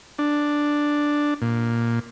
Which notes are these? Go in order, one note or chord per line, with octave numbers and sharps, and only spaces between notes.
D4
A#2